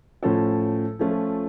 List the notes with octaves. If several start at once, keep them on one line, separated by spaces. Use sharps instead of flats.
A2 F3 C#4 F4 A4
F3 A3 C#4 F4